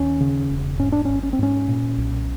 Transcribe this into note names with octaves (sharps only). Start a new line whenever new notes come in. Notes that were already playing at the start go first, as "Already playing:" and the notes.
Already playing: D#2 C#4
C#3
E1
G#2 C#4
D4
G#1 C#4
C#4
C4
G#2 C#4
A#2
B1